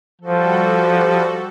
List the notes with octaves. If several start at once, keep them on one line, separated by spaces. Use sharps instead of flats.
F3 G3 F#4 A4